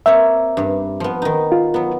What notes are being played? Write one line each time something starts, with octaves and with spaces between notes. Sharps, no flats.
A#3 C4 C#5 E5
G2 G3
F3 B3
D#3 D#4
F4
F#3 B3